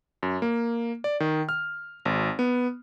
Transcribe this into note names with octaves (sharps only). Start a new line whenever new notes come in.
F#2
A#3
D5
D#3
F6
G#1
B3